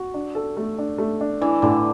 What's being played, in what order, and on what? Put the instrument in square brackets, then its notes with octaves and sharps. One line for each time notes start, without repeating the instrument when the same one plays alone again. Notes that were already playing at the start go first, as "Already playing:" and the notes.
Already playing: [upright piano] F#4
D4
A4
A3
D4
A3
D4
[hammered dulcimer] E3 [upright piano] D4
[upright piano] A2 [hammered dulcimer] D3